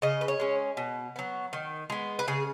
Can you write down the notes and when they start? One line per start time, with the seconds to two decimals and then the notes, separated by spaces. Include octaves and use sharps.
0.02 C#3 D#5
0.21 B4
0.28 C#5
0.40 G#3 C#4
0.77 B2
1.16 F#3 B3
1.53 D#3
1.90 G#3 B3
2.19 B4
2.28 C#3 G#4